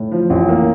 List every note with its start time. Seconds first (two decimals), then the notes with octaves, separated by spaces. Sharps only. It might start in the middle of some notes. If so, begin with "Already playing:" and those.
Already playing: A2
0.11 F3
0.30 A1
0.48 A#3